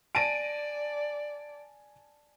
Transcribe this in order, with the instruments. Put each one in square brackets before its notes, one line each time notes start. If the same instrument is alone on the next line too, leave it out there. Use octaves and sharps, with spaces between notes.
[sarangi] D5 [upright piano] G#5 A5 A#6 [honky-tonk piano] D7 D#7